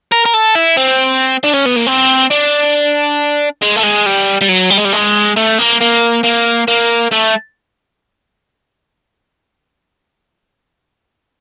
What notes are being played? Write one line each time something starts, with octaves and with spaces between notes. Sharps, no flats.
A#4
A#4
A4
E4
C4
D4
C#4
B3
A#3
C4
D4
G#3
A3
G#3
G3
G3
F#3
G3
G#3
G3
G#3
A3
A#3
A#3
A#3
A#3
A3